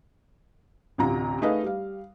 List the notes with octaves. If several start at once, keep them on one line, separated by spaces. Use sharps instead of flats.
A1 D2 C3 F4 A#5
A3 D#4 G#4 B4 D#5 F5
G3 F5